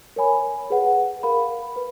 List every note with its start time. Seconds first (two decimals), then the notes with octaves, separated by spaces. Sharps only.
0.16 A#4 C#5 G#5 B5
0.70 G#4 B4 F#5
1.23 A#4 F5 B5
1.76 B4